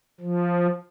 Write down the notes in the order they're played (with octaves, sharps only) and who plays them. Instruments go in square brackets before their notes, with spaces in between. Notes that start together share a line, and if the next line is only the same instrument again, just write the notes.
[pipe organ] F3